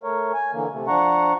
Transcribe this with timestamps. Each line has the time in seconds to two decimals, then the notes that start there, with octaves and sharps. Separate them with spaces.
0.03 A3 A#4 C#5
0.34 G#5
0.53 D3 E3 A#3
0.71 C3 A3
0.87 F3 D4 F#5 A#5 C#6